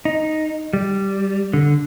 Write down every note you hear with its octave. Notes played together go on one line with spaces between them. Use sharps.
D#4
G3
D3